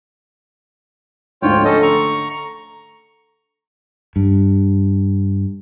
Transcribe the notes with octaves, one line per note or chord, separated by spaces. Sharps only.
D2 G#2 F3 F4 C#5 G5
D3 A3 C#4 A4 D#5
A#5 C#6
G2